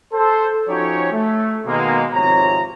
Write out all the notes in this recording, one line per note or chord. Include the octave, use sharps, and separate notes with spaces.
A4 C5
F3 C#4 D#4 F#4 G4 C#5
A3
B2 D#3 G#3 A#3
G#1 C3 F3 C#5 A#5